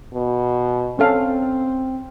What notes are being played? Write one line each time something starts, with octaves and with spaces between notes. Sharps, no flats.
B2
C4 C#4 A4 F5